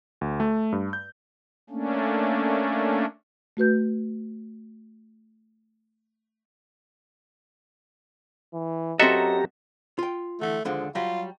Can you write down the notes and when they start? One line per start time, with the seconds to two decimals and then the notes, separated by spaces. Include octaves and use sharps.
0.21 D2
0.40 A3
0.72 G2
0.93 G6
1.70 A3 A#3 C#4 D4
3.57 A3 F#4 B4 G6
8.54 E3
8.99 F#2 C4 F#4 G4 A4 D#5 E5 A#5
9.99 F4 G5
10.41 D3 E3 A3
10.65 D#2 D3 F3 G#3
10.95 F#3 G3 F4 G4